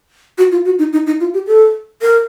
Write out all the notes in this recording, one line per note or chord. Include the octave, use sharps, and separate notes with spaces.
F#4
F4
F#4
D#4
D#4
D#4
F4
G4
A4
A#4